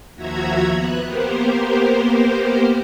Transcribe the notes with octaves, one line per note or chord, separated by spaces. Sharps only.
D#2 F3 F#4 E5 A#5 G#6
B3 F#6
A#3 B3 G4 A#4 C5